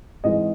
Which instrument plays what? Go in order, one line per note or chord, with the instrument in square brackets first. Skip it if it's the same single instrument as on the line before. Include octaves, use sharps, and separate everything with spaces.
[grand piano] G#1 G#2 E3 G#3 D#5